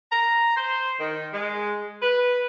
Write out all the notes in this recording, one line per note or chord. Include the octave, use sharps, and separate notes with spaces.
A#5
C5
D#3
G#3
B4